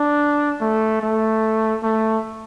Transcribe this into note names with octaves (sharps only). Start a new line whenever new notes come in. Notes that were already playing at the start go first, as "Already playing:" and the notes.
Already playing: D4
A3
A3
A3